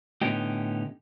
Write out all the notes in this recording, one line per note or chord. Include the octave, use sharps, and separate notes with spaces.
A2 D3 B3 C#4 D#4 G4